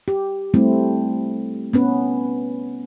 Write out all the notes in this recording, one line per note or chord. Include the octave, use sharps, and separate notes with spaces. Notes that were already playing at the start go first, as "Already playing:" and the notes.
G4
G3 A3 C4 E4
B3 C#4 B4